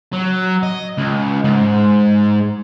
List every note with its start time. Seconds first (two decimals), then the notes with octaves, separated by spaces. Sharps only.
0.13 F#3
0.63 D#5
0.98 C#2
1.44 G#2